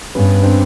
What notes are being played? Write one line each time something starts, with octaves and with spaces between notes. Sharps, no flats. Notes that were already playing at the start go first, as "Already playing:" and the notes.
G2 B3 C#4
C4 D4